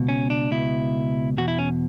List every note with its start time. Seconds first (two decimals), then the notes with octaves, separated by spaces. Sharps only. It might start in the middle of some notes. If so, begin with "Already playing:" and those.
Already playing: C#2 B2
0.09 C#4
0.30 D4
0.51 C#2 B2 E4
1.37 E2 B2 F#4
1.48 E4
1.59 C#4